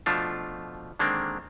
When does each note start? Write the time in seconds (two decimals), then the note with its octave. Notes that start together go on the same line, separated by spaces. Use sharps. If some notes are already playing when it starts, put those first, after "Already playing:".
0.06 B2 F3 A3 D4 F4
0.99 D3 D#3 G#3 A#3 C4 D4